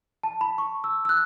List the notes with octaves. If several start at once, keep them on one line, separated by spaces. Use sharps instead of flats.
A5
B5
C#6
E6
E6
F#6